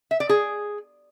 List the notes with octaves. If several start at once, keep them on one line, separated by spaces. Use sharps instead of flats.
E5
D5
G#4